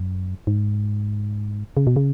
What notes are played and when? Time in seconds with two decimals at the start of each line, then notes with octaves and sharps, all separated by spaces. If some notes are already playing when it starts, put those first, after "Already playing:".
Already playing: F#2
0.47 G#2
1.77 C#3
1.87 B2
1.96 C#3